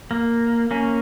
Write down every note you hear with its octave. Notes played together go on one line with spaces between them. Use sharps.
A#3
A#3 C#4